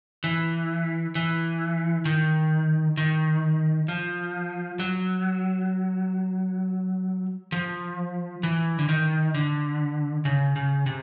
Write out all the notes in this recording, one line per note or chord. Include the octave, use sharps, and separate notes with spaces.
E3
E3
D#3
D#3
F3
F#3
F3
E3
D3
D#3
D3
C#3
C#3
C3